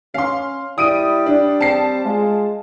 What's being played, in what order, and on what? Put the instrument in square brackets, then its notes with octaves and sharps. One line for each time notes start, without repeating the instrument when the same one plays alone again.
[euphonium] C#4 [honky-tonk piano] F5 C6
[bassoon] G3 [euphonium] E4 [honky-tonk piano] D#6 D7 D#7
[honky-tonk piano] D4
[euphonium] C4 [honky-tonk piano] A5 C7
[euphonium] G#3 [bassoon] F4